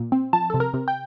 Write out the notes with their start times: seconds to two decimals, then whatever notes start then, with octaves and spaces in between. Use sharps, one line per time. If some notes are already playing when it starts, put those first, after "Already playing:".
Already playing: A#2
0.12 C4
0.33 F3 A5
0.50 C3 A4
0.60 A#4
0.74 C3
0.88 G5